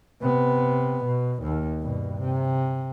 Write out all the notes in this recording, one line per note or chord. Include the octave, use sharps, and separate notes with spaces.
C3 B3
B2
D#2
G2 B2
C3